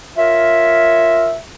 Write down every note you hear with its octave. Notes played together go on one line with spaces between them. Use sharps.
F4 A#4 C#5 E5